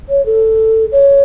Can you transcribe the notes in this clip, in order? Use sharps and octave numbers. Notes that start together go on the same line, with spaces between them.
C#5
A4
C#5